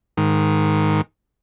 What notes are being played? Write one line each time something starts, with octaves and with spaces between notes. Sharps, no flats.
G#2 D#3